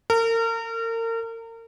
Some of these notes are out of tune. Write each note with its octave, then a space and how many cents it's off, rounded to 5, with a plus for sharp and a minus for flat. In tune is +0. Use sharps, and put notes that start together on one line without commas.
A#4 -35